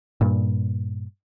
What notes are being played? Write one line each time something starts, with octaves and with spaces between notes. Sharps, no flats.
G2 A#2